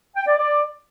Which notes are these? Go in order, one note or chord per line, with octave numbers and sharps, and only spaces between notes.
G5
D5
D5